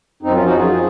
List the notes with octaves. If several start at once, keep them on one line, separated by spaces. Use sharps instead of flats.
F#2 C4 D#4
F3 C#4 F4
D#4 F#4
F#2 F4 G#4
F3